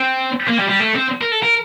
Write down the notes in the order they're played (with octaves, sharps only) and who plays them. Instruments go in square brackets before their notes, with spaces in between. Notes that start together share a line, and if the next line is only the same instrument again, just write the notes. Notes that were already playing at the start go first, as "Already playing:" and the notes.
Already playing: [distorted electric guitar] C4
A#3
G3
G3
A3
C4
A#4
A4
A#4